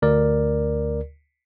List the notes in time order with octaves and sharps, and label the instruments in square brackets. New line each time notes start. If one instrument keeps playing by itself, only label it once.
[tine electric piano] D2 A#4 D5